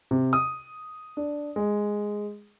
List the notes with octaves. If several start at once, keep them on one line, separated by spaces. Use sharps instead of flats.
C3
D#6
D4
G#3